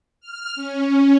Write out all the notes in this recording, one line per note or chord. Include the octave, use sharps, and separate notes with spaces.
F6
C#4